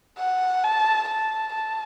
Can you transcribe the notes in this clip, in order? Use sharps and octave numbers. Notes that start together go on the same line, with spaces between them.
F#5
A5
A5
A5